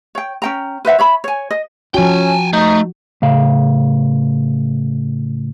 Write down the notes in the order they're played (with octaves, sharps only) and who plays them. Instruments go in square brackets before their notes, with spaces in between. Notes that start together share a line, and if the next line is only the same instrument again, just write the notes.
[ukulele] C#5 G5
C#4 G5 A#5
B4 C5 E5 F#5
C#5 E5 B5
C#5 G#5
D#5
[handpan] F3 F#4 [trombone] C#4 [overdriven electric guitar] G5 G#5
[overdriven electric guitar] A3 [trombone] D#4
[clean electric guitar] A2 C#3 F5